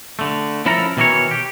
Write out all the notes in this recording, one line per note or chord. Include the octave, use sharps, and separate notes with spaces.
D3 A3
F3 C#4 E4 A4 A#4 A#5
B2 D#3 E3 G#4 A#4 C#5
G4